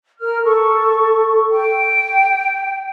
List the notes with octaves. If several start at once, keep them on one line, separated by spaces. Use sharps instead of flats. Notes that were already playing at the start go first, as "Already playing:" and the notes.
A#4 F6
A4 C#6
G5